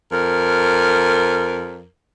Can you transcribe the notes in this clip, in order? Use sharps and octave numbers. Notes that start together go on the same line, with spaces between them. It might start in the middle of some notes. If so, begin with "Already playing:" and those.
F2 A#4